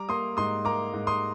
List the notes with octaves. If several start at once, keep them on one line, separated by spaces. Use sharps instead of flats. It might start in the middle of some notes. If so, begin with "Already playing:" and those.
Already playing: G3 A#5 D6
A#3 C6 D#6
G#2 C6 D#6
A#3 A#5 D6
G#2
C6 D#6